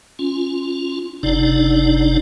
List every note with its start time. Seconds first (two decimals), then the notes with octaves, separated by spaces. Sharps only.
0.19 C#4 F4
1.23 F#1 C3 D4 D#4 D5